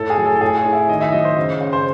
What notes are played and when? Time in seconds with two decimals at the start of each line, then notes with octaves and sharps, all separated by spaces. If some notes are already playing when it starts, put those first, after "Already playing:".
Already playing: A2 A4
0.10 G#4
0.18 F#3
0.25 A4
0.36 A4
0.41 A2 G#4
0.58 G#4
0.65 A2
0.73 E4
0.89 D#3 D#5
1.01 E5
1.13 F#3 D#5
1.25 C5
1.37 C#3
1.61 C#3
1.73 C5